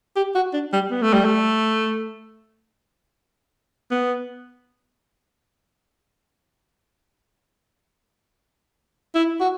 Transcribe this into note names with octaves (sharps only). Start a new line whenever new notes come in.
G4
F#4
D4
G3
B3
A3
G3
A3
B3
E4
F#4